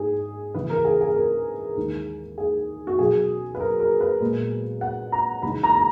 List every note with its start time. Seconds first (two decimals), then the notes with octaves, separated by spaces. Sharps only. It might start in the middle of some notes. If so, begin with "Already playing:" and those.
Already playing: G#2 G#4
0.54 C#2 C#3 E3 B4
0.70 A#4
0.85 G#4
1.01 G#4
1.16 A#4
1.77 D#2 D#3 G#3
2.38 G#4
2.87 F#4
2.99 B2 F#3 C#4 G#4
3.55 B4
3.60 A#4
3.80 A#4
4.01 B4
4.20 A#2 G#3 B3
4.81 F#5
5.12 A#5
5.42 E2 C#3 G#3 D#4 B5
5.63 A#5
5.75 A#5